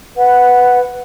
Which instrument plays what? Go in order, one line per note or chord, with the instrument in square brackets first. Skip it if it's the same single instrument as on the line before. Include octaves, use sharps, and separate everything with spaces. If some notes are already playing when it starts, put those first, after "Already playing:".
[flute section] B4 F#5